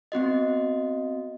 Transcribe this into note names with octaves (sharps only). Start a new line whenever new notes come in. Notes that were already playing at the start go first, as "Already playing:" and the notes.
B3 C4 F#4 D#5